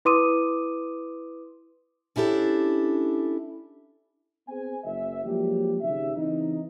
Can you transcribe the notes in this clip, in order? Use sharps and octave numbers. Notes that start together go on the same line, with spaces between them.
E4 B4 C6 D6 D#6 D#7
C#4 D4 E4 G4 A4
B3 C4 G#4 C5 G#5
F#1 E5
F3 F#3 G#3 A#3 D4 G4
G#1 C#3 D#4 G4 E5
C#3 E3 C4 D4 D#4